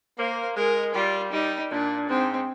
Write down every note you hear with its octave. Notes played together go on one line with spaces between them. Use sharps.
A#3 C5
G#3 A#4
G3 F4
G3 D#4
A#2 D4
G#2 C4